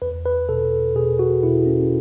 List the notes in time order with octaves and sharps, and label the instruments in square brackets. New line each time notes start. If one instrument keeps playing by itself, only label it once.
[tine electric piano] E2 B4
B4
B2 A4
B2 G#4
F#4
B2 E4
C#4